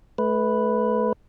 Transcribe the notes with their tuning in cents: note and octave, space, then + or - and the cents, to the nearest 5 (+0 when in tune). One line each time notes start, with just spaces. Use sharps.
A3 -30 B4 +0